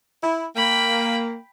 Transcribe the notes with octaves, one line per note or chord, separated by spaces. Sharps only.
E4
A#3 G5 B5